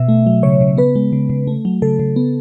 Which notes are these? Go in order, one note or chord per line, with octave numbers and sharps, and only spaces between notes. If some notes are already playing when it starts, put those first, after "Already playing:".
Already playing: B2 E5
A3
F#3
C#3 C#5
C#3
B3 B4
G#3
C#3
C#3
A3
F#3
C#3 A4
C#3
B3